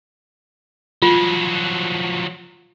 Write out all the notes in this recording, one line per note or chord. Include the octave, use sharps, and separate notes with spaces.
F3 F#3 F4